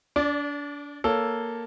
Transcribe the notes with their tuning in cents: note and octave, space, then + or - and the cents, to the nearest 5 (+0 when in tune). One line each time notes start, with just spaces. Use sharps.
D4 -30 D5 +0
A#3 +0 A4 +0 C#5 +15